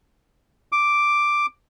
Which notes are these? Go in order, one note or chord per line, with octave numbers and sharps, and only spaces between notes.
D6